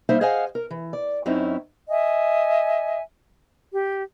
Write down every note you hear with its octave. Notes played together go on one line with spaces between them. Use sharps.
G3 A#3 D#4 C5 E5
G#4 C5 D#5 F5 F#5 G#5
A#4
E3
D5
F#2 C4 C#4 D#4 E4
D#5 E5 G#5
G4